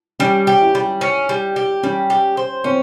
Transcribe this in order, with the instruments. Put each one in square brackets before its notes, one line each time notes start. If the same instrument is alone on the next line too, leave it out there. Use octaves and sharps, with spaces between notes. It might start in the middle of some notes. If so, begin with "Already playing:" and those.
[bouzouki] G3 [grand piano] C#4
[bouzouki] G4
[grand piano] E4
[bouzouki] G3
C#4
G3
G4
[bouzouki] G3 [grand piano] C#4
[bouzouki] G4
C5
[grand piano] C4 [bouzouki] C#4